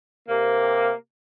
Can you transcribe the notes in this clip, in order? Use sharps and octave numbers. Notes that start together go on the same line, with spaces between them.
C3 A#3